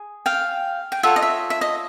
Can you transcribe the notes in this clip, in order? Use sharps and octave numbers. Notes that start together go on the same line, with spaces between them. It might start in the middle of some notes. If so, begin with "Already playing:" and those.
Already playing: G#4
F5 G5
G5
F4 A4 C#5 E5 F#5
D#5
E5
E5
D#5